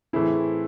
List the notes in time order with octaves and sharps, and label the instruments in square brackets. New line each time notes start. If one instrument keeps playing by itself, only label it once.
[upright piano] A2 E3 A3 C4 G#4 [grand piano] E4